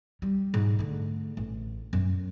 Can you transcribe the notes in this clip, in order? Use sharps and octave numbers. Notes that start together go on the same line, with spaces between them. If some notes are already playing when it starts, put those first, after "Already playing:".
G3
G#2
D3 A3
A1
F#2